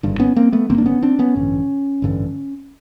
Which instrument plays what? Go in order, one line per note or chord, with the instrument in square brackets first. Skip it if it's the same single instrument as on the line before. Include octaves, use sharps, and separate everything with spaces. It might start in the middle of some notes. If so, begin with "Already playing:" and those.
[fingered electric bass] G#1 G2 D3
B3 C#4
A#3 C4
A3 B3
G#1 G2 D3 A#3 C4
D4
B3 C#4
C4 D4
B3 C#4
A1 G2 D3
A1 G2 D3